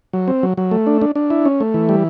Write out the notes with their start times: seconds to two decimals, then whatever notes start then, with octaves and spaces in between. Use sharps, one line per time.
0.13 F#3
0.28 C4
0.43 F#3
0.57 F#3
0.71 A3
0.87 D4
1.02 D4
1.15 D4
1.30 E4
1.45 C#4
1.60 A3
1.74 E3
1.89 G3